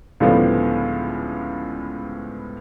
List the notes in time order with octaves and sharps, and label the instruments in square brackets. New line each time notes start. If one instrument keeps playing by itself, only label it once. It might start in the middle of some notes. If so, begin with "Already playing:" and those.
[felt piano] C#2 A2 D3 F3 G3 B3